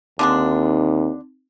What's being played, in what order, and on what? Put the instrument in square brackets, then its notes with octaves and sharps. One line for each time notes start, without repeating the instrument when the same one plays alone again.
[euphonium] D#2 [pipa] D3 G#3 D4 [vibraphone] C4 D#4